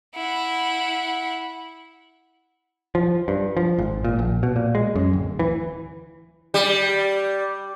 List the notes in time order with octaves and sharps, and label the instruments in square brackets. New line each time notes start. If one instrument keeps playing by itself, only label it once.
[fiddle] E4 F#5
[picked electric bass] F3
G2
F3
G#1
A#2
A#1
B2
A#2
G#3
F#2
D1
E3
[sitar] G3